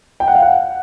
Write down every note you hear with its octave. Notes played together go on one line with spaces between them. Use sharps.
G5
F#5
F5
F#5